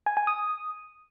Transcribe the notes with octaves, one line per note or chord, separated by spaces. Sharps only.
G#5
G#5
D#6